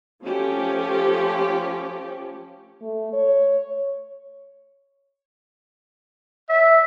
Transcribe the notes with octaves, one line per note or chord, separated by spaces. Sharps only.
F3 A3 C#4 G4
A3
C#5
E5